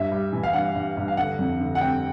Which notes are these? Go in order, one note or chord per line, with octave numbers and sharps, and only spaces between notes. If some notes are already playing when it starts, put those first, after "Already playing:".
Already playing: G2 E5
G3
E3
F5
G2 F#5
G2
G2
F5
D3 F#5
F2
D3
F#5
C4 G5